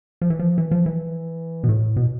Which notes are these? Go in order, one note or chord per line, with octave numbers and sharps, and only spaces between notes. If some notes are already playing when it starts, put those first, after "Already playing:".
F3
E3
F3
E3
F3
E3
B2
A2
B2